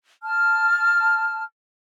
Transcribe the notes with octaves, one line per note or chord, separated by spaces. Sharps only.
A5 F6